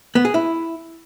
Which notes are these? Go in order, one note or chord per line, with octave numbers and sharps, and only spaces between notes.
B3
G#4
E4